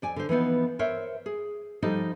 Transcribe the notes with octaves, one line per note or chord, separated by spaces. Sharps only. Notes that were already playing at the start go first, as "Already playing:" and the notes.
F2 D5 G#5
D3 C5
E3 F3 B3 D#4
A#4 C5 C#5 E5
G#4
F3 G3 D#4 G4 A4 D#5